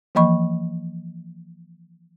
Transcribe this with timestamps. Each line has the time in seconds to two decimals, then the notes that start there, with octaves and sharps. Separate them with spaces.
0.15 E3 F3 A#3 D#5 B5 C#6